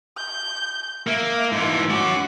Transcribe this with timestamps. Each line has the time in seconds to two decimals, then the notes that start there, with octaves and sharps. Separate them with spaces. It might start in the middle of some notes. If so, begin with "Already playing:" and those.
0.17 G6
1.07 A#3 E5
1.52 G#2 E3 C6
1.90 C#4 F#4 D6